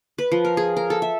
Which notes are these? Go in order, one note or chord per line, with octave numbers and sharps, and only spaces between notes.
B4
F3
A#4
G#4
A#4
A4
E5